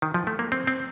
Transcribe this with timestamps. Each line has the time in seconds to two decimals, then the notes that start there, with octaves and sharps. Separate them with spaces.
0.02 D#3
0.14 F3
0.27 A3
0.39 A#3
0.52 C4
0.67 C4